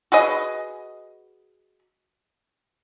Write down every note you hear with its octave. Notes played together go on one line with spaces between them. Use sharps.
F#4 G#4 B4 D#5